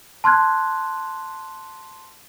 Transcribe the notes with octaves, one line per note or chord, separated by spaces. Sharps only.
A5 C6 F6 F#6 G#6